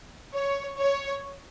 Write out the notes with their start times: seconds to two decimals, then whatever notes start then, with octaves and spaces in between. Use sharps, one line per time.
0.34 C#5
0.79 C#5